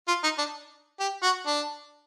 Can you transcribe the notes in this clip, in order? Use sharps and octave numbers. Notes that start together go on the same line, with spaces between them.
F4
D#4
D4
G4
F#4
D4